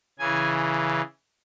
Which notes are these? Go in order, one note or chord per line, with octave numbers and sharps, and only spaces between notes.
C#3 E3 G#5